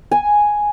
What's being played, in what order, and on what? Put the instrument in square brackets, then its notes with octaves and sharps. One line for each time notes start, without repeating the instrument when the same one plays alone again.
[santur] G#5